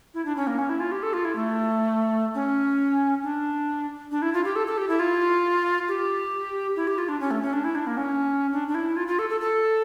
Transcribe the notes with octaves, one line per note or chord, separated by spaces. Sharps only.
E4
D4
C#4
A#3
C#4
E4
F4
G4
A4
F4
E4
A3
C#4
D4
D4
E4
F4
G4
A4
A4
G4
E4
F4
G4
E4
G4
F4
D4
C#4
A3
C#4
D4
E4
D4
A#3
C#4
D4
D4
E4
F4
F4
A4
A4
A4